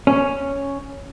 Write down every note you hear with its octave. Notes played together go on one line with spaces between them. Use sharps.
C#4